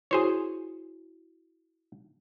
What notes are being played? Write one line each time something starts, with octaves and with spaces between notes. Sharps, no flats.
E4 F#4 G#4 C5 C#5